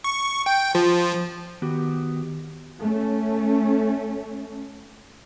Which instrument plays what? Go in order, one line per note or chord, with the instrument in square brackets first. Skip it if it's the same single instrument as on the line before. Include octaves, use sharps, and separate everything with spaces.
[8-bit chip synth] C#6
G5
F3
[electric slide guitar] D#3 B3 F#4 G4
[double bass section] A3 C#4